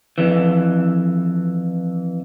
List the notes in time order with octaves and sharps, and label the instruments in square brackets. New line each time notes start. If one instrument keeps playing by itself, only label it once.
[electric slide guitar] F2 E3